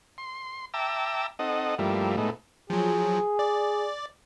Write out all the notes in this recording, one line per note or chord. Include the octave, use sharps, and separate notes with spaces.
C6
E5 G5 A5 A#5 D6 E6
C4 D#4 A4 D#5 F#5
G2 F3 G3 A3 A#3 E4
A2 G#3 A3 B3 D#4
F3 F#3 G#4
D5